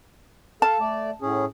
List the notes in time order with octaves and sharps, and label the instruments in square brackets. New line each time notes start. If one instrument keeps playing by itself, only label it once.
[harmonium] A4 F5 [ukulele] A5
[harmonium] A3 D5
A2 C#4 G#4